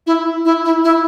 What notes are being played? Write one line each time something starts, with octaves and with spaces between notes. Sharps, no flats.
E4
E4
E4
E4